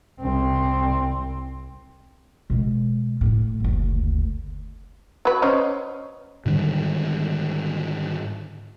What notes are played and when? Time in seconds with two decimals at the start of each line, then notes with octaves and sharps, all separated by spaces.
0.21 C2 C4
2.50 B2 G#3
3.21 A2
3.60 F#1 D2
5.25 F#3 B4
5.42 C#4 C5 D#5
6.46 G#2 D3 D#3 G3